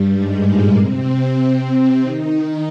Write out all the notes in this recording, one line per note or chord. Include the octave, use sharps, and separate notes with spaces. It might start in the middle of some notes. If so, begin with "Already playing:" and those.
Already playing: G2 G3
G#2 G#3
A#2 A#3
C3 C4
D#3 D#4
D#3 D#4